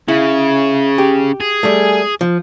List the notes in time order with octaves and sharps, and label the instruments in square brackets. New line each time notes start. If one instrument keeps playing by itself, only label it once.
[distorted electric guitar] C#3 [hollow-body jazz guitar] E4
[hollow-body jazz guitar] G4
[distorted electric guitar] G#4
[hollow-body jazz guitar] G3 A3
F3